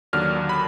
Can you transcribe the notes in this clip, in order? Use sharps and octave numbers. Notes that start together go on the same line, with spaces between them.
D#2 D3 F#3 A#3 D4 F6
B5